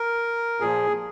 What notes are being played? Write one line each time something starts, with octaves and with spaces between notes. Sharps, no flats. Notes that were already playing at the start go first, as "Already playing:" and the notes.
Already playing: A#4
A#2 F3 G#4